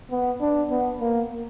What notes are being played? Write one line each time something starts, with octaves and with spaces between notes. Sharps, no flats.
B3
D4
B3
A#3